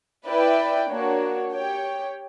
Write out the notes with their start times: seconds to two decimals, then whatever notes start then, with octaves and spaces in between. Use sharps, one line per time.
0.25 E4 B4 D5 G5
0.88 A#3 D4 F#4 C#5
1.52 G4 C#5 G5